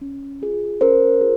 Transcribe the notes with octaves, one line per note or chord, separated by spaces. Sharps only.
C#4
F4 G#4
C#4 A#4 C5
F4 G#4